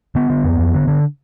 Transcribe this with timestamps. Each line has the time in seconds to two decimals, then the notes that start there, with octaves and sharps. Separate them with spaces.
0.15 D3 B3
0.30 D3
0.44 F2
0.59 F2
0.74 D3
0.88 D3